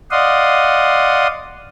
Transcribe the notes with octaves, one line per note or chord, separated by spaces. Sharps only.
D5 D#5 F5 F#5 C6 D#6